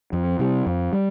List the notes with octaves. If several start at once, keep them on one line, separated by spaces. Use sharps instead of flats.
F2
C3 G3
F2
G3